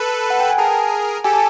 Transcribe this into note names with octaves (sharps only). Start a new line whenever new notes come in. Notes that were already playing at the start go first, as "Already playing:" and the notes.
Already playing: A4 B4
F#5
G5
G#5
G#4 A#4 A5
G4 A4 G#5
A5